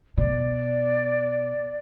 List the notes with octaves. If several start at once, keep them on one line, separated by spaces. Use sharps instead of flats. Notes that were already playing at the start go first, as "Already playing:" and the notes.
B2 D5